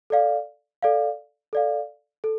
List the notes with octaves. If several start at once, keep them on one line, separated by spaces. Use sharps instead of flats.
A4 D5 F5
A4 D5 F5
A4 D5 F5
A4